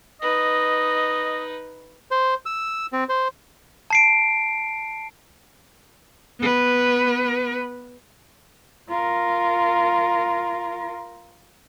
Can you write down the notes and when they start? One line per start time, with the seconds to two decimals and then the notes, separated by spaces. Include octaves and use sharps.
0.22 D#4 B4 D#5
2.11 C5
2.46 E6
2.93 C4
3.09 C5
3.90 A5 C7 D7
6.40 B3 B4
8.89 F4 A#4